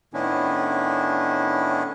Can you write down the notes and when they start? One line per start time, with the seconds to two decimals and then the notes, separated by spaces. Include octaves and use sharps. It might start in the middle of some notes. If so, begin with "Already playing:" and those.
0.14 A2 D#3 B3 C#4 D4 E4